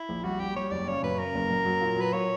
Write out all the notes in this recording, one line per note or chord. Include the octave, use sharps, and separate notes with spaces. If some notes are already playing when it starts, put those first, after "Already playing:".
Already playing: E4
A#1
G3 F#4
G3 G4
G3 C#5
F#1 D5
C#3 C#5
F#2 B4
C#3 A#4
F#1
F#2
F#3
A#2
F#3 B4
A#2 C#5